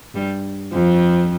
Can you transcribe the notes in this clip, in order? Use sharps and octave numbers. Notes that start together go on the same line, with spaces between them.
G2 G3
F2 F3